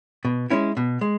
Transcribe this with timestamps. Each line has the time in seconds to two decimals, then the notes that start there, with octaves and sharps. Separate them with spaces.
0.25 B2
0.50 G#3 C#4 E4
0.77 B2
1.01 G#3